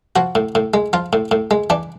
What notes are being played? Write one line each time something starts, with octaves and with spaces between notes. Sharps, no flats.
F3 F#4
A2
A2
G#3
F3 F4
A2
A2
G#3
E3 D4